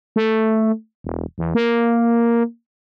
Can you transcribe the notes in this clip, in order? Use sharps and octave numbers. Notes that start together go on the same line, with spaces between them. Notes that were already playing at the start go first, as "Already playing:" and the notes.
A3
E1
E2
A#3